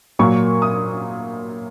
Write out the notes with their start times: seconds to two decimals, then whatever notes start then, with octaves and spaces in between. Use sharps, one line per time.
0.19 A#2 F#3 A#3 C#6
0.62 D#6